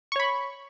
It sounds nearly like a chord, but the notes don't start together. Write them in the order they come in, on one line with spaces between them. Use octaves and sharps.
C#6 C#5 B5